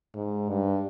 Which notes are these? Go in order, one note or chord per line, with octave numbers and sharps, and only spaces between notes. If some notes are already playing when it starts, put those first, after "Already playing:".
G#2
G2